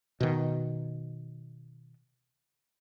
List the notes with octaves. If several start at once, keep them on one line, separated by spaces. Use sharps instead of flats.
B2 D#3